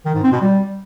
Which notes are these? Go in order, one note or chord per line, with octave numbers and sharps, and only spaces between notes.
D#3
G#2
C4
B2
G3